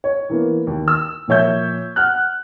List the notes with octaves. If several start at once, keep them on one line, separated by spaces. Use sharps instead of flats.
C#5
E3 A#3 B3
D#2
E6
A#2 F3 C#5 E5 G6
F#5 F6 F#6